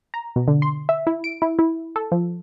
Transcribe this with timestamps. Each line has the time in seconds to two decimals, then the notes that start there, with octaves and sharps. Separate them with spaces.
0.14 A#5
0.36 B2
0.48 D3
0.62 C6
0.89 E5
1.07 E4
1.24 D7
1.42 E4
1.59 E4
1.96 A4
2.12 F3